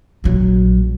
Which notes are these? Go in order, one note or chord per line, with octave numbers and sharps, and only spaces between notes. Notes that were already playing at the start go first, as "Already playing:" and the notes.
A#1 F#3